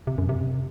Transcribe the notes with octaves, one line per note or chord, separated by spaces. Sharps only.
C3
F#2
C3